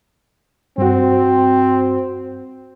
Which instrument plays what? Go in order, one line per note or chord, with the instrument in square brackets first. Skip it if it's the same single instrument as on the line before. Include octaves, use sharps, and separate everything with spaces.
[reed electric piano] G2 F#4 [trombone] C4